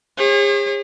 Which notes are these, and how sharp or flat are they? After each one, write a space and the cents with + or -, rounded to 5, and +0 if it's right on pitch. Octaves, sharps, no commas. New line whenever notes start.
G#4 -45 C#5 -40